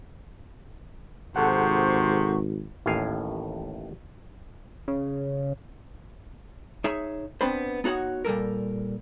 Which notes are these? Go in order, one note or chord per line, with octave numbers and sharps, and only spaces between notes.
G#1 C3 G#4 A4 C5 F#5 C#6
A1 D#2 A2 F5 G#5
C#3
D#4 G#4 C#5 E5
B3 C4 D4 B4 C5
B3 D#4 F#4 C#5 F#5
A#2 G3 A4 A#4